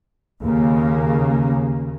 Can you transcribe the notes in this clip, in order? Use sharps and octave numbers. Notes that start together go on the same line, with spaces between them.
D#2 C#3 A#3